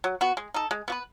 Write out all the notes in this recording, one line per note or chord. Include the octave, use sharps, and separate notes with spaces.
F#3
B3 F#4
G#3
D#4 A4
G#3
B3 F#4 B4